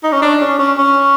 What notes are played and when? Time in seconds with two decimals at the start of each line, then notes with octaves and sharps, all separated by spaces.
0.04 D#4
0.12 C#4
0.22 D4
0.41 C#4
0.59 C#4
0.78 C#4